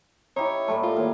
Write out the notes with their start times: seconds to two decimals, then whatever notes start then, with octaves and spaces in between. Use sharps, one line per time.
0.36 D#4 E4 G4 C#5
0.68 A2 G3 A3
0.83 A#2 F4
0.96 D#3 C#5